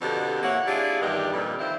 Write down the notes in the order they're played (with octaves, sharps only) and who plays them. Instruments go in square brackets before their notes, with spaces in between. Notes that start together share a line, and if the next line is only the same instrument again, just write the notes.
[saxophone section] F2 B2 D3 G4
A#3 E4 C#5 F#5
D4 E4 F4 G4 G#4
E2 G2 D#3 G4
F2 A#2 D3 G3 B4
D#3 F3 C4 E4